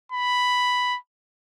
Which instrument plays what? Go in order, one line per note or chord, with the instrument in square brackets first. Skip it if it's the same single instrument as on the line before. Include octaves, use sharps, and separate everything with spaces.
[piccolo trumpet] B5